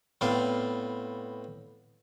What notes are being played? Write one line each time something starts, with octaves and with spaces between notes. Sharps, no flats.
A2 B3 C4 D5 F5